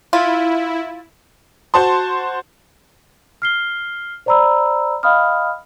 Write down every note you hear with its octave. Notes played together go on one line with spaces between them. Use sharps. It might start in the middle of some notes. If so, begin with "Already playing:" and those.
E4 F4
F#4 C5 A5 C6
F6 C7 G7
C5 D5 A#5 B5 E6
D#5 F5 G5 B5 D#6 F6